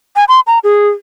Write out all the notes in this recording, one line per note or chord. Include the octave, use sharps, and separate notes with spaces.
G#5
C6
A#5
G#4